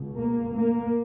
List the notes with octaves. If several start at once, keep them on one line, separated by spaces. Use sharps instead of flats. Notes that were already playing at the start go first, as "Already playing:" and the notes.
Already playing: C#2 B2
A#3
A#3